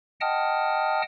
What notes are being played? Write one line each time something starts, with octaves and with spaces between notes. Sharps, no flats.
D#5 F#5 G5 A5 D#6 F6